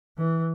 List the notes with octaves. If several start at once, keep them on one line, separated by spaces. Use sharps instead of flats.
E3